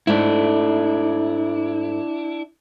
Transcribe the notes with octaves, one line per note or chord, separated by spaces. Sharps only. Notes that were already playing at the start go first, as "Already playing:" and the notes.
G#2 A3 D4 E4